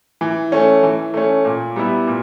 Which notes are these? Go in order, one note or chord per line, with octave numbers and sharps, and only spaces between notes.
E3
A3 C#4
E3
A3 C#4
A#2
G3 B3 E4
A#2